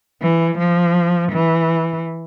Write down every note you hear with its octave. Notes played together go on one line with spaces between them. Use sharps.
E3
F3
E3